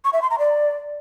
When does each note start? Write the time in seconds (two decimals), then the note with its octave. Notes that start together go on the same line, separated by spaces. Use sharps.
0.04 C#6
0.13 E5
0.22 C6
0.30 A#5
0.39 D5